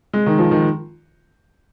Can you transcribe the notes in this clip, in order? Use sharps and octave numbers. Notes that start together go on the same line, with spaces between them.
G#3
D#3
F3
D#3